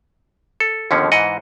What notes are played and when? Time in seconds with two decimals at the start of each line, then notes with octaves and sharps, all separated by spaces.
0.60 A4
0.91 D#2 B2 D3 F3 C#4
1.12 G#2 E3 D#5 F#5